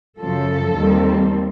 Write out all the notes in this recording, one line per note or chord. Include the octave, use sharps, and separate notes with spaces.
F#2 C#3 F3 A4
D#2 D#3 G3 C4